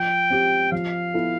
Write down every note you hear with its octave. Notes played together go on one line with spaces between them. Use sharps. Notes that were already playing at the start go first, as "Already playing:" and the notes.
Already playing: F3 G5
C4 G4
F3 F5
B3 E4 A4